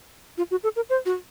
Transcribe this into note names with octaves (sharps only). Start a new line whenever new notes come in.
F4
F#4
A4
A#4
C5
F#4